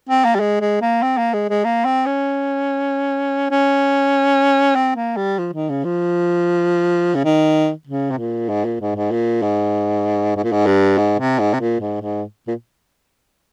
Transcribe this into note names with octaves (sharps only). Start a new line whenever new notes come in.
C4
A#3
G3
G#3
G#3
A#3
C4
A#3
G#3
G#3
A#3
C4
C#4
C#4
C4
A#3
G3
F3
D#3
C#3
F3
C#3
D#3
C#3
C3
A#2
G#2
A#2
G#2
G#2
A#2
G#2
G#2
A#2
G#2
G2
G#2
C3
G#2
C3
A#2
G#2
G#2
A#2